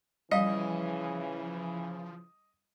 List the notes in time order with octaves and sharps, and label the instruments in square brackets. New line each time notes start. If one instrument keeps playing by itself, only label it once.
[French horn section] C#3 E3 [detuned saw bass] F3 [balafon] G3 F5 [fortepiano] D#5